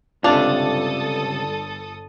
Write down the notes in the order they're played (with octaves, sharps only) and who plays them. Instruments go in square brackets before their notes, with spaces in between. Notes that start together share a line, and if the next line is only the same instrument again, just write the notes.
[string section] G1 A4 D#6 [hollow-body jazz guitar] C#2 C3 F4 [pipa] D4